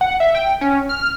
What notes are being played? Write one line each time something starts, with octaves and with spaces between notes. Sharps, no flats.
F#5
E5
G5
C#4
F6